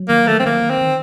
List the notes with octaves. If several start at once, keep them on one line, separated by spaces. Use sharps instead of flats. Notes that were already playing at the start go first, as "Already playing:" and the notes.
Already playing: F#3
D#3 A#3
A3
C4
D#3 A#3
C4
D#3